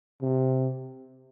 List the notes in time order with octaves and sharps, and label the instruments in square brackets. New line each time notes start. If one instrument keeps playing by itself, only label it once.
[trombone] C3